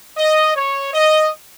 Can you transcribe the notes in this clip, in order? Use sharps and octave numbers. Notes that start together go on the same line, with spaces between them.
D#5
C#5
D#5